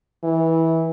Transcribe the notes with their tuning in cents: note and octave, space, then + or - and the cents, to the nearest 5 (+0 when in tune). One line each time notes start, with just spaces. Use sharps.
E3 -20